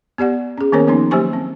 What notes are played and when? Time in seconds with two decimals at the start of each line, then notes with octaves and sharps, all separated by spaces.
0.18 B3 G4 D5 F#5
0.58 C#4 G#4
0.72 D#3 A#3 B3 C#4 A#4 C#5
0.87 F3 A#3 B3 C#4 D#4
1.11 F#3 A#3 G4 C5 G#5 C#6
1.33 C4